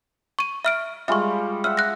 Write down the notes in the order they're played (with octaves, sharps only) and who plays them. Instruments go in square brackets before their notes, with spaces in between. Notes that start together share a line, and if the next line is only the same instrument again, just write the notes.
[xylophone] C#6 D#7
E5 F6 D7
[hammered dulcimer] G3 G#3 F4 [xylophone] E5 C#6
[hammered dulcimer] E5 F#5 [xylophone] F6
[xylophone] F#6 A#6